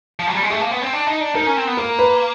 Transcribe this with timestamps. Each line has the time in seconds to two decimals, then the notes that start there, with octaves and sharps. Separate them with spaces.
0.19 F3
0.27 F#3
0.35 G3
0.43 G#3
0.50 A3 G#4
0.61 A#3
0.71 B3
0.82 C4
0.93 D4
1.07 D#4
1.21 D4
1.35 D#4 A#4
1.47 C#4
1.57 C4
1.67 B3
1.77 A#3 A#4
1.99 B4